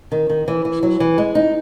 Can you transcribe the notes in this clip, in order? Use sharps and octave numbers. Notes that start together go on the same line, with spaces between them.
D#3
D#3
E3
E3
F#3
E3
G#3
D#4